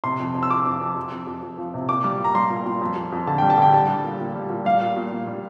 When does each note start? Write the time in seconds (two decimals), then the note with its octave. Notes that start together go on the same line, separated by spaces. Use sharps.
0.04 C3 C6
0.20 F2
0.35 F2
0.43 E6
0.50 F2 D6
0.65 F2
0.81 F2
0.96 F2
1.12 F2
1.27 F2
1.42 F2
1.58 F3
1.74 C3
1.89 A#2 D6
2.04 G3
2.19 A#2
2.24 A#5
2.35 G3 C6
2.50 A#2
2.66 A#2
2.81 F2
2.96 F2
3.12 F2
3.27 D3 A5
3.38 G5
3.42 G3
3.50 A5
3.58 D3 G5
3.73 G3 A5
3.88 G3
4.04 A#2
4.20 A#2
4.35 G3
4.50 A#2
4.65 G3 F5
4.81 A#2
4.96 A#2
5.12 A#2
5.27 G3